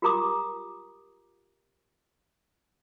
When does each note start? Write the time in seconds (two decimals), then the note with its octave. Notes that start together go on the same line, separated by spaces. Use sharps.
0.02 F4 G4 A#4 A#5 D6 D#6